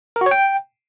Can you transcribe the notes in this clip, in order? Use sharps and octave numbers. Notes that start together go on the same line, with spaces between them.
A#4
F#4
C#5
G5